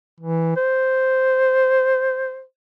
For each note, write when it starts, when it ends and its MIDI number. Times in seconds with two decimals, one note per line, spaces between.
0.21 0.54 52
0.57 2.43 72